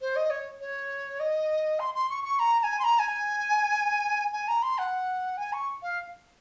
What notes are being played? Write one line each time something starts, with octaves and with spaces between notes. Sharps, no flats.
C5
D#5
C#5
C#5
D#5
C6
C6
C#6
C#6
A#5
A#5
G#5
C6
A#5
G#5
G#5
A#5
C6
F#5
G#5
C#6
F5